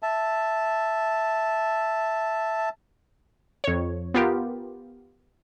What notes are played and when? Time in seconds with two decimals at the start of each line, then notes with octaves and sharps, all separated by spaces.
0.03 E5 A5
3.64 F2 C#5
4.14 B3 F4 G4 A#4